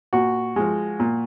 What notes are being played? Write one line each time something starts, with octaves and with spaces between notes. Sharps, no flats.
A#2 F#4
F3 G#3
A#2